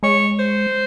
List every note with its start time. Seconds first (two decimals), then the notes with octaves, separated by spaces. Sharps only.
0.03 G#3 C#5
0.39 C5